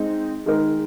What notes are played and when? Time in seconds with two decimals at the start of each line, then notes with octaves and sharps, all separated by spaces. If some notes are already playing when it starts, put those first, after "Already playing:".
Already playing: G#3 C4 D#4
0.46 D#3 G#3 D#4 A#4